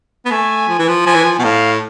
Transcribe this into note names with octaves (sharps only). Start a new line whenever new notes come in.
B3
A3 G#5
F3
E3
F3
F3 G#5
E3
F3
B2
A2 F5